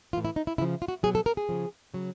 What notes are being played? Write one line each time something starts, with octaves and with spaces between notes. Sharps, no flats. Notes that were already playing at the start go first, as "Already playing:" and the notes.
A2 E3 F4
E4
D#4
E4
C#3 F3 E4
F4
F#4
B2 F#3 G#4
A4
A#4
G#4
C#3 F3
C#3 F#3